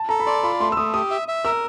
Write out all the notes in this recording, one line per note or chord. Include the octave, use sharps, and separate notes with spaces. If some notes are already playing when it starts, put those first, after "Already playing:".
Already playing: A5
A4 A#5
B5
D5 C6
F4 B5
A3 C6
E6
A3 D#6
G4 D#6
E5
E5
A#4 E6